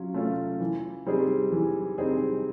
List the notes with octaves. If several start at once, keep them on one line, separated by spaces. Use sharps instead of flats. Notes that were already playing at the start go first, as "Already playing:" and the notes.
Already playing: F#3 C#4 F4
A3 C#4 F4
E3
G3 C4 D#4 G#4
E3
G3 C4 D#4 G#4